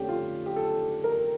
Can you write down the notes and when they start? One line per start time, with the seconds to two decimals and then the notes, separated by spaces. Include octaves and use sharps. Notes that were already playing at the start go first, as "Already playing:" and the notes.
Already playing: F2 D3 A3 C#4 G4
0.09 F4
0.46 G4
0.56 A4
1.04 A#4